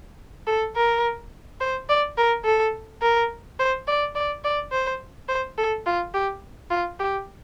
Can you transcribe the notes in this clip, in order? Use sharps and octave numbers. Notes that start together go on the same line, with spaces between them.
A4
A#4
C5
D5
A#4
A4
A#4
C5
D5
D5
D5
C5
C5
A4
F4
G4
F4
G4